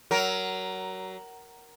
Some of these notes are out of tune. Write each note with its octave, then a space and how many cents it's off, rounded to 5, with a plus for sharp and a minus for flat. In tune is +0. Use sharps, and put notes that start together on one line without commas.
F#3 +25 A#4 +0